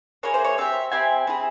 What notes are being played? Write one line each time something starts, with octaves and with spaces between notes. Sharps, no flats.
A#3 E4 G#4 C#5
C5
C#5
C4 G4 E5
C4 E4 G4 G#5
C4 E4 G#4